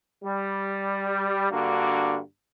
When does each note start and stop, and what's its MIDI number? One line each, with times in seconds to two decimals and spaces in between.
0.24 1.47 55
1.50 2.18 43
1.50 2.18 50
1.50 2.18 58
1.50 2.18 66